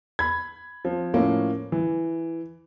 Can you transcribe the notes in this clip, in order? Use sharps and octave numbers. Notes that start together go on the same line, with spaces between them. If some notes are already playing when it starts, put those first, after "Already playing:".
B5 G#6
F3 C4
A2 F3 A#3 C#4
E3